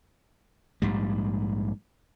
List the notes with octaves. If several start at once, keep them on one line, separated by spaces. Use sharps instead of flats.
A#1 G#2 G3